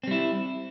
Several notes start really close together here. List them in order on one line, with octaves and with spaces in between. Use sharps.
C4 G3 E4